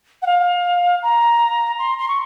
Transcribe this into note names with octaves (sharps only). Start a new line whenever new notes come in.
F#5
F5
A#5
C6
C6
C#6